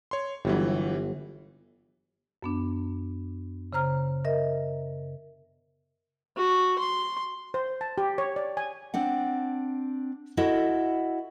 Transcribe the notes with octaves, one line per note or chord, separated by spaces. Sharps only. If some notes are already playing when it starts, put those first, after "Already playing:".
C#5 C6
G1 E3 F#3 G3
F#2 B3 D4
C#3 C5 A#5 F6
A#4 D#5 E5
F#4
C6
C5
A5
G4
C#5
D5
G#5
C4 D4 F#5
E4 F#4 A4 D#5 F#5